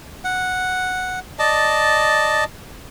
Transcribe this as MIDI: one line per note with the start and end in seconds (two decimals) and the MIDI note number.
0.24 1.19 78
1.39 2.44 74
1.39 2.44 75
1.39 2.44 81